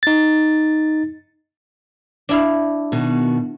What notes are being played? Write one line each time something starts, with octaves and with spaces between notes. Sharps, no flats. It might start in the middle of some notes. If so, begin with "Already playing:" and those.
D#4 A6
D4 E4 F5
B2 D#3 F#4